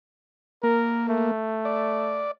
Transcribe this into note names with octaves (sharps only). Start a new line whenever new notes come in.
A#3 A#4
A3
D5